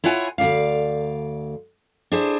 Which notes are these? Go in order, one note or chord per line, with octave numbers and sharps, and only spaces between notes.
E4 F4 C#5 F#5 G#5
D2 A#2 D5 F5
D4 E4 G#4 C5